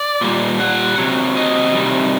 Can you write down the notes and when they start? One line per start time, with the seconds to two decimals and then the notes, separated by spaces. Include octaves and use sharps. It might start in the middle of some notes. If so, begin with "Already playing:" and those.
Already playing: D5
0.21 A#2 G3
0.60 F#5
0.98 C3 F#3
1.37 D#5
1.75 C3 D#3 G3